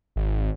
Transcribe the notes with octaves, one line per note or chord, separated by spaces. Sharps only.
G#1